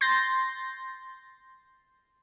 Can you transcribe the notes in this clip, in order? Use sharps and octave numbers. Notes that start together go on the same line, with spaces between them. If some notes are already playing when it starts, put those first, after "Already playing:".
C6 G6 A6 A#6